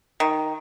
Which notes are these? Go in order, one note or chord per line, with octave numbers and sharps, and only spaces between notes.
D#3